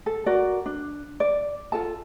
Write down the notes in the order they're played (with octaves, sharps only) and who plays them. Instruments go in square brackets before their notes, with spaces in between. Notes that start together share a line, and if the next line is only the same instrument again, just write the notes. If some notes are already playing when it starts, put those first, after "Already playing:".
[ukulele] A4
F#4 A#4 D5
D4
D5
F4 A4 A5